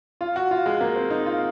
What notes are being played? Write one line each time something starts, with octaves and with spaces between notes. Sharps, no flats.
F4
F#4
F4
G#3
A#3
C4
D#4
F4